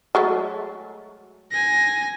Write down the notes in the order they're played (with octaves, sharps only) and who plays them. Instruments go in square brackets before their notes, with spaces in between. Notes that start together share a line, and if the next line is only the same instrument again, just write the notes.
[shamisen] F#3 G#3 A3
[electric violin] G#5 A#6